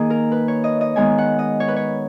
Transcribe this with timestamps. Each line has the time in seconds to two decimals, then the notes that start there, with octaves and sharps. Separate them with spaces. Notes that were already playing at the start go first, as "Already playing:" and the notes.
Already playing: D#3 A#3 G#4
0.10 A#4
0.32 B4
0.48 C#5
0.64 D#5
0.81 D#5
0.96 D#3 G#3 B3 G#5
1.18 F#5
1.39 D#5
1.60 C#5
1.68 B4
1.76 C#5